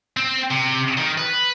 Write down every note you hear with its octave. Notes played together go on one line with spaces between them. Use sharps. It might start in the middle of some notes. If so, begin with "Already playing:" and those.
C4
C3
D#3
B4